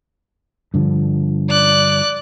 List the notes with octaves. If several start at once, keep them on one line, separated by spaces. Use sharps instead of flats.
G2 D3 F3
D5 F#6